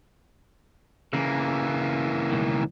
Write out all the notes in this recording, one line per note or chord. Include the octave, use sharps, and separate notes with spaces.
C#3 E3 A#3
C#2 B2 D#3